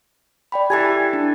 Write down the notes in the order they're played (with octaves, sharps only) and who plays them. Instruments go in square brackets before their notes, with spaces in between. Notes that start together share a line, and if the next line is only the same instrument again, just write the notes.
[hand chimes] D5 G5 B5
[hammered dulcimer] E3 A4 G#5 [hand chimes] G4
[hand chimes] D4